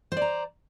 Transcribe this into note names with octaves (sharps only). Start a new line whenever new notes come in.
C5 D5 A#5